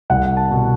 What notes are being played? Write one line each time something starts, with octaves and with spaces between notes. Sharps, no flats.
C2 F#5
A5
B2